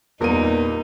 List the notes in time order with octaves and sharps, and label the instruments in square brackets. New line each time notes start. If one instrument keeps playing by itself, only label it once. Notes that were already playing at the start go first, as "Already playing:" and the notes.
[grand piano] E2 D#7 [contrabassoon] A#2 [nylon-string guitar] G3 A#4 [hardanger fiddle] D#4